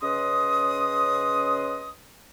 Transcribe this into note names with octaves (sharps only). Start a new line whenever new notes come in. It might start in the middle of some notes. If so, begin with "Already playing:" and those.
C#3 C#4 B4 D#5 C6 D#6